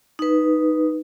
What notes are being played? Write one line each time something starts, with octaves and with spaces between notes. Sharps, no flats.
D#4 B4